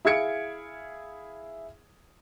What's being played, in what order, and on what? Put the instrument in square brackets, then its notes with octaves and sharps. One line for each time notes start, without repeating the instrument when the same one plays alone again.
[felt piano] E4 G#4 F5 G#6 C#7 D7